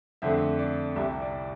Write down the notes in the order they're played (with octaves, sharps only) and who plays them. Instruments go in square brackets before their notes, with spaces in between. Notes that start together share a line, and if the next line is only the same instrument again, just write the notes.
[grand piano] F2 D3 A3 C4 E5
D5
C2 C3 G3 E5
D5